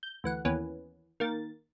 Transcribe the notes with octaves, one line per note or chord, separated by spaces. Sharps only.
G6
D2 E3 F#5
D#2 E3 B3 C#4
D#3 A#3 A6